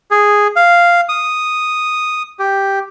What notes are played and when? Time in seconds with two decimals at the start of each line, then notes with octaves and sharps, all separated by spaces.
0.11 G#4
0.56 F5
1.09 D#6
2.39 G4